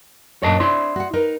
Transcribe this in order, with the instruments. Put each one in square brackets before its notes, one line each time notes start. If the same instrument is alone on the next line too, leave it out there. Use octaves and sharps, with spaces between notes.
[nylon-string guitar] F#2 A#2 [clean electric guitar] C#5 D#5 A5
[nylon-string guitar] D4 C5 [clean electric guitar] E4 D5 C6
[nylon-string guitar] F#4 F#5
D#4 A#4 B4